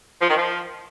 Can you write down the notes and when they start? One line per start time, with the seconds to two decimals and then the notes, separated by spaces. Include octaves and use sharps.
0.21 F3
0.29 D#3
0.37 F3